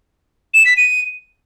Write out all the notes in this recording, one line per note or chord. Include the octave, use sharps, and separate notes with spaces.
E7
B6
D#7